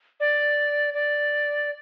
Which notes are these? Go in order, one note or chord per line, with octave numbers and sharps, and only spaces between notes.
D5
D5